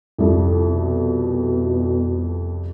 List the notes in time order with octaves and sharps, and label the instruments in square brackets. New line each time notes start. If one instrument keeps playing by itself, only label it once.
[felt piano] C2 F2
[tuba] B2